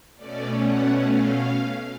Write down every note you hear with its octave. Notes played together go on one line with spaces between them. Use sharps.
B2 A3 C#4 D5
F#5
F5